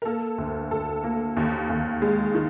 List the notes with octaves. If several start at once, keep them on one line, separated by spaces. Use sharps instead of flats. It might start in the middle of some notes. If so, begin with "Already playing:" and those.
A#4
A#3 A4
D2
D2 A4
A#3
D#2
D#2
G#3
D#3